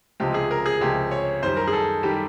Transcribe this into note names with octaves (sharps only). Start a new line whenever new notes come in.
C#2 C3 F3 G#3 G4
G#4
A#4
G#4
C#2 C3 F3 G#3 G4
C#5
F#2 D#3 G3 C5
A#4
G#4
A4
D#3 G3 G4